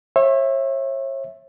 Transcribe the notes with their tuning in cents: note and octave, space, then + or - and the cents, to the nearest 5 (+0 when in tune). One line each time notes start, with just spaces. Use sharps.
C#5 -40 E5 +0